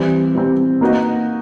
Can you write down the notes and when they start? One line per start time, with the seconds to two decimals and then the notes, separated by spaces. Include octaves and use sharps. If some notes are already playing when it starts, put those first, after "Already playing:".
Already playing: E3 G3 C4
0.35 E3 G3 C4
0.81 A#3 D#4 F#4 B4 D#5